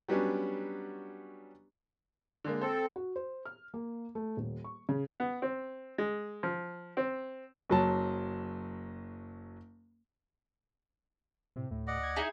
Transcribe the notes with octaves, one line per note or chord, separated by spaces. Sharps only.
F#3 G3 B3 C#4 D4
D3 G#3 A#3
C4 A4 C5
F#4
C5
F6
A#3
A3
D#1
C#6
C#3
B3
C4
G#3
F3
C4
F#1 F#3 A5
A2 C3
D2 A2
D5 D#5 F#5
G#6
D#4 E4 G#4